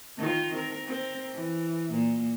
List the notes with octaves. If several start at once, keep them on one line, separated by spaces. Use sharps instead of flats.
D#3 D#4 F4
C4 A#4
C4 A#4
E3
A#2 A#3